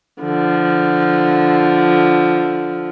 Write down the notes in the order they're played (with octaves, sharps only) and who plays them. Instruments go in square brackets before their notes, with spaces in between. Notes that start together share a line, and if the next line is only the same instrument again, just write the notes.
[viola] D3 F3